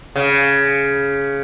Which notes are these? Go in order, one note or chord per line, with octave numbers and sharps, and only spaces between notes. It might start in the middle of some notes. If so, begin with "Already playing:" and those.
C#3